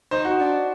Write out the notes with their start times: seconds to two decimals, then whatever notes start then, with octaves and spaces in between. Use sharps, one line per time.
0.11 D#4 C5
0.25 F#4
0.40 D4